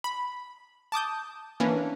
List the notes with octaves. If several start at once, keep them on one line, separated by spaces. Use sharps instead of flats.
B5
A5 D6 D#6 G6
E3 A#3 C#4 D4